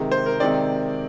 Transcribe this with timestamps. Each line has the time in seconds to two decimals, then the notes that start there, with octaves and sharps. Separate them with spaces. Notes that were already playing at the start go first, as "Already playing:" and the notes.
Already playing: C3 D#3 G#3
0.12 C5
0.26 A#4
0.40 C3 D#3 G#3 C4 D5